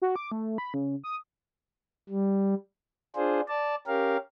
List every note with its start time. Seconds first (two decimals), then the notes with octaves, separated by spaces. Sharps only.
0.02 F#4
0.16 D6
0.32 A3
0.58 B5
0.74 C#3
1.04 D#6
2.10 G3
3.16 D4 F4 G#4 C5
3.48 D5 A5
3.87 C#4 G4 A#4 F5